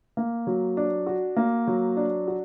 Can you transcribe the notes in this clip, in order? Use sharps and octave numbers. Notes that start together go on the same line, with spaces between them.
A#3
F#3
D4
F#4
A#3
F#3
D4
F#4